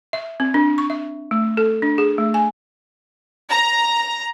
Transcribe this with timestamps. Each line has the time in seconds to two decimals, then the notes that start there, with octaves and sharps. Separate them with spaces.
0.13 E5
0.40 C4
0.54 D4
0.78 C#6
0.90 E5
1.31 A3
1.57 A4
1.82 D4
1.98 G#4
2.18 A3
2.34 G#5
3.50 A#5